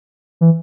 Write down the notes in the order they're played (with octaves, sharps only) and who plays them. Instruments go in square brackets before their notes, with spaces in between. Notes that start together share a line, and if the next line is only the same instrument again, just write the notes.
[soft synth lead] E3